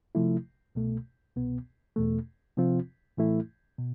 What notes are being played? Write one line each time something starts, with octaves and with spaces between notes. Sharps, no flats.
C3 F3 A3 E4
C2 B2 A3
C2 B2 B3
E2 B2 A3
C3 F3 C4 F4
A2 E3 A3 E4
B2